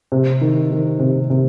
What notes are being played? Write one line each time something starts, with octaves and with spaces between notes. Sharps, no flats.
C3
D#3
D#3
C3
C3